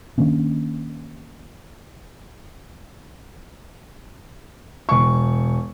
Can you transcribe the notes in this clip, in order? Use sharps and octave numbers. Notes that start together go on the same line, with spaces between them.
D#3 A#3 C#4 D4
E1 C#6